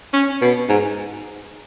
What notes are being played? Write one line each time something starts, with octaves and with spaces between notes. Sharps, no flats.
C#4
B2
G#2